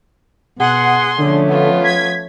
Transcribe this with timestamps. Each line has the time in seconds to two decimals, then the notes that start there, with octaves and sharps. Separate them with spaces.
0.59 B2 G#4 F#5 C6
1.18 D3 F3 A3 C#4
1.48 B3 F4
1.84 G#6 B6